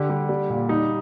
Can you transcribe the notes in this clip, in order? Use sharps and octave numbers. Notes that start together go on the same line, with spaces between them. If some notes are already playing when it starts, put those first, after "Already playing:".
Already playing: D3 G4
G3
G3
A#2
G3 D#4